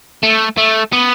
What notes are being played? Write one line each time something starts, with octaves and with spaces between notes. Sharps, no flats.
A3
A3
B3